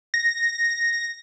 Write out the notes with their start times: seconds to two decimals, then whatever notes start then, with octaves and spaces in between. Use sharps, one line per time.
0.14 A#6